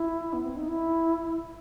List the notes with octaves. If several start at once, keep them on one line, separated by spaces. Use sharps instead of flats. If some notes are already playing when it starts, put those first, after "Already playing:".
Already playing: E4
B3
C4
D#4
E4